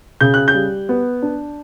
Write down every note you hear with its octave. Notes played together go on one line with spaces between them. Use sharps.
C#3 G6
F#6
G6
G3
B3
D4